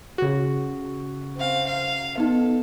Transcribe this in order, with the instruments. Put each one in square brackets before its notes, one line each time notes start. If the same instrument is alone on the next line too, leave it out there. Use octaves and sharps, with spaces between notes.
[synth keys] C#3 F#4
[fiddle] C4 F5
F5
[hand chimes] B3 D#4 [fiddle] A4